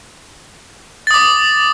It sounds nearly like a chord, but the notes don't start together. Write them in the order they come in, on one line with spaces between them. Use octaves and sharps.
A6 D#6 D6